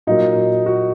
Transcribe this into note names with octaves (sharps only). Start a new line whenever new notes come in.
A#2 F#3 A#3 D#4
F#4